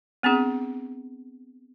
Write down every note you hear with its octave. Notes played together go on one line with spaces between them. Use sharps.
B3 C4 D4 G#4